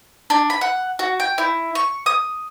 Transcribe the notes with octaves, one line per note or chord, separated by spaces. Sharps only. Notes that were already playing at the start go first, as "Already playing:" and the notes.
D4
B5
F#5
F#4
G5
E4
C#6
D#6